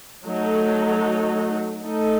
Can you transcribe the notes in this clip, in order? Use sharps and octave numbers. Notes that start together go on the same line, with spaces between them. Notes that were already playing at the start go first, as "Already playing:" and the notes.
F#3 A3 D#4 A4
A3 D#4 A4